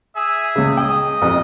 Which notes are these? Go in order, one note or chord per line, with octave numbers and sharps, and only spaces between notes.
G#4 E5
C#2 C#3
D#5 G5
A1 F2 D#6